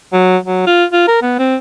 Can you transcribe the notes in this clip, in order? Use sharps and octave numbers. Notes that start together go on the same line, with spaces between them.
F#3
F#3
F4
F4
A#4
B3
C4